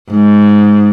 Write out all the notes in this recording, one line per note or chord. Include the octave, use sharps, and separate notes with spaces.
G#2